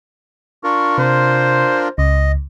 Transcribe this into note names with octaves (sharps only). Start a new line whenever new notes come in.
D4 F4 A#4 C#6
C3 C5
C#2 D#5